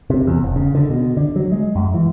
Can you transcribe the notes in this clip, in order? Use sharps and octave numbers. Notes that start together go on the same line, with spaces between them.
C3
E2
E1
C#3
D3
B2
D3
F#3
G#3
F#2
E3